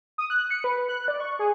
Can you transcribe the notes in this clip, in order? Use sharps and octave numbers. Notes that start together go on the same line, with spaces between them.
D#6
F#6
C#7
B4
F#6
D5
C#6
G#4